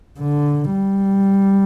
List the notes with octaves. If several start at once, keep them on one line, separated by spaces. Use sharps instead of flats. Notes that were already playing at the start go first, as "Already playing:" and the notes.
D3
G3